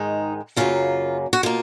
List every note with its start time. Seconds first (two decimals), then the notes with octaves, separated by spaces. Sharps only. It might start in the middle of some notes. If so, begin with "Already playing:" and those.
Already playing: G#2 D#3 G#3 D#4
0.56 F#2 C#3 F#3 A#3 F4
1.33 F#4
1.43 B2 A#3 F4